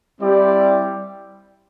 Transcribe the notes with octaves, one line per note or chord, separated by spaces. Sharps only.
G3 C4 E4 G4 D5